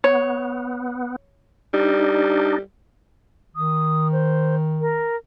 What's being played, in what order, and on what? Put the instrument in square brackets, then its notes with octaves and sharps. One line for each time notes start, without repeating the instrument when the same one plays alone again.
[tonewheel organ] B3 [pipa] C#5
[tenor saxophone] G3 [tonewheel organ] D4 D#4
[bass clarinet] D#3 [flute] D#6
[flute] C5
A#4